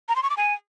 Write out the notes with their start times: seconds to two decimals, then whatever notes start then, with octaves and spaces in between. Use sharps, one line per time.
0.09 A#5
0.16 C6
0.23 C#6
0.30 D6
0.37 G#5